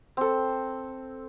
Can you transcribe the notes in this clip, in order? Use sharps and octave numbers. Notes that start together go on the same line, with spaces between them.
C4 A4